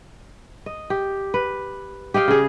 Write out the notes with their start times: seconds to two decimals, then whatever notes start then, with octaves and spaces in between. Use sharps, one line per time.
0.66 D#5
0.90 G4
1.34 B4
2.14 G4 D#5 F5 G5
2.28 C#3 G#4